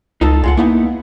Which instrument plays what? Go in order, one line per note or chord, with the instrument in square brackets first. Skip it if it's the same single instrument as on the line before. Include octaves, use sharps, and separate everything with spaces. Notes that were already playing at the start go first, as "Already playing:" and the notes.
[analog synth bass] C#2 [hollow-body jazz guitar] D#4 F4 A4
[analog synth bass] C#2 [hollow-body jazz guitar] G#3 F4 F#5
[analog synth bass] A#3 [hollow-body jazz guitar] B3 D#4 E4